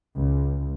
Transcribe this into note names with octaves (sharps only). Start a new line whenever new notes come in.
C#2